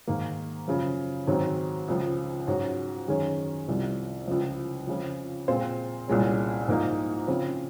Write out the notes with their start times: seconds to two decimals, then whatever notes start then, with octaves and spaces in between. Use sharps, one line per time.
0.07 G#2 D#3 A#3
0.68 F#2 C#3 F3
1.27 G#2 D#3 F#3 C4
1.88 C#2 C#3 F3
2.47 G#2 F#3 C#4 F#4
3.07 F#2 D#3 G#3 C#4
3.68 C2 C3 F3
4.27 C#2 C#3 F3
4.87 F2 C#3 F3
5.48 A#2 G#3 C4 F4 C5
6.08 C2 A#2 G#3 C#4
6.68 G#2 F3 A#3 D#4
7.28 C#3 F3 C4